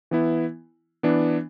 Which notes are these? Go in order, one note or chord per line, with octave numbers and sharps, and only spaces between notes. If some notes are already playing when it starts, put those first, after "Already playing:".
E3 B3 E4
E3 B3 D4